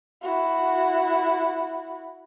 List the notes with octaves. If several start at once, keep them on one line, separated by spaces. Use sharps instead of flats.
E4 F#4